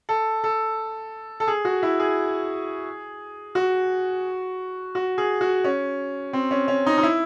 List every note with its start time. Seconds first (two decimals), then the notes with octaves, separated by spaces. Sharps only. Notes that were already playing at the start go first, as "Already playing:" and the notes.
0.09 A4
0.44 A4
1.40 A4
1.48 G#4
1.65 F#4
1.83 E4
2.00 G#4
3.55 F#4
4.95 F#4
5.18 G#4
5.41 F#4
5.64 C#4
6.33 C4
6.51 C#4
6.68 C#4
6.86 D#4
6.98 D#4
7.03 E4